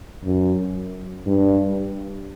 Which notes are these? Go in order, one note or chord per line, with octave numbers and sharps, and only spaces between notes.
F#2
G2